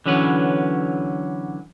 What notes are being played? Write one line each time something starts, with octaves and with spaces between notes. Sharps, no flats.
D3 E3 F#3 C#4 B4